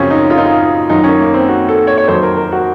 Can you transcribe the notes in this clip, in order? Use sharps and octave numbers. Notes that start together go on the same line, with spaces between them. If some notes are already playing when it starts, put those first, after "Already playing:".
Already playing: F#2 C#3 F3 C4 C#4
D#4
F4
D#4
F4
F#2 D#3 F#3 D#4
C#4
A#3
C4
F#4
A4
C#5
C#5
F2 D#3 F#3 C5
A#4
A#4
F#4